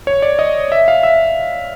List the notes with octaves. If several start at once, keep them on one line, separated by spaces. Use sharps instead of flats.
C#5
D5
D#5
E5
F5
E5